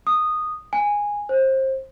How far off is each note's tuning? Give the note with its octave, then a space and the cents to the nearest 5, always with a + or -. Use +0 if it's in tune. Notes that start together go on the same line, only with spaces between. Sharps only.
D#6 -10
G#5 -10
C5 +25